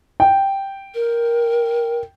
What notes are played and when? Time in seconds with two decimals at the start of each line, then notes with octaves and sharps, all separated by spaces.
0.20 G5
0.94 A#4